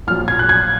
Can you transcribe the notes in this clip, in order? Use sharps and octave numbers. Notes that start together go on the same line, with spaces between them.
A#1 A#2 F#3 F6
G#6
F#6
G#6